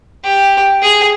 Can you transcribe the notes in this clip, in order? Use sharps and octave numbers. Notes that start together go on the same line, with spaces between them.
G4
G#4